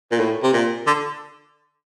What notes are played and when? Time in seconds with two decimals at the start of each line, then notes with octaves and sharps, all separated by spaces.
0.12 A#2
0.20 A2
0.43 C3
0.54 A#2
0.87 D3